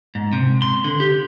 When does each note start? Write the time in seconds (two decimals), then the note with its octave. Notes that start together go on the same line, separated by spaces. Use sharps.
0.15 G#2
0.33 C3
0.62 C6
0.84 D3
1.00 G4